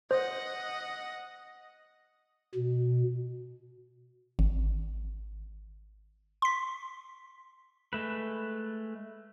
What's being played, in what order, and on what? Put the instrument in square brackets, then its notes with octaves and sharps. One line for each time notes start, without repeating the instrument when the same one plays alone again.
[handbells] C5 [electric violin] D#5 F#5
[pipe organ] B2
[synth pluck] G#1
C6 B6
[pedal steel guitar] G#3 A3 B4